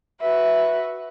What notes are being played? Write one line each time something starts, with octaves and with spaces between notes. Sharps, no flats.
F#4 B4 E5